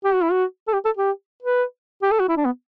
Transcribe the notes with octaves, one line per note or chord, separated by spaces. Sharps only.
G4
F#4
E4
F#4
A4
G4
A4
G4
B4
G4
A4
F#4
E4
D4
B3